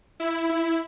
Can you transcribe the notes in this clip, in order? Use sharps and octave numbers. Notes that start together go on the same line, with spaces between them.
E4
E4